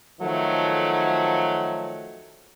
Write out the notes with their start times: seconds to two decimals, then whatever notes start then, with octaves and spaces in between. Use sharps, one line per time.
0.21 D#3 F3 F#3 A3